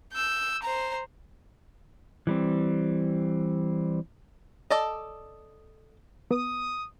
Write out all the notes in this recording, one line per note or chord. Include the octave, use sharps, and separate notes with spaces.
E6 G6
C5 A#5
E3 G3 C4
A4 D5 D#5
B3 D#6